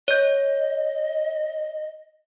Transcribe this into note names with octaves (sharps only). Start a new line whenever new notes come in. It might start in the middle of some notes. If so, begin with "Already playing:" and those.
C#5 D#5 G6